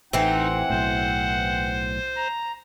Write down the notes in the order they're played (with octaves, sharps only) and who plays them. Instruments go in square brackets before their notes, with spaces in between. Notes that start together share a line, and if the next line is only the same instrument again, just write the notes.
[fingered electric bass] A1 [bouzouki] E3 C4 [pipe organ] D#4 [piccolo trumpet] F#5
[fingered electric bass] B1 A2 [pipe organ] C5
[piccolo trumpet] A#5